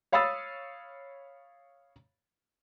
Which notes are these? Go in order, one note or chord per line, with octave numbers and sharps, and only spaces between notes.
C#5 F5 B5 D#6 E6 A6